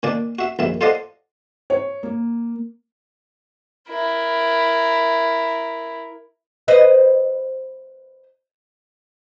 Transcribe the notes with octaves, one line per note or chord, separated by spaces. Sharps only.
A#2 D#3 D4 D5
F#4 E5
A#1 F#2 D#3 E5
F4 A4 C5 D5 D#5 F#5
C#5
A#3
E4 A#4
B4 C5 D#5